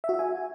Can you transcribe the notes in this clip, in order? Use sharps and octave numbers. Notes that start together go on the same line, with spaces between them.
E5
F#4
E5
G#5